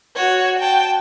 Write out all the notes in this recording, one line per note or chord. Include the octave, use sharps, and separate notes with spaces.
F#4 C#5
G5 A5